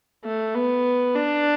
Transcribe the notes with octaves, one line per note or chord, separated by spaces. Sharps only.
A3
B3
D4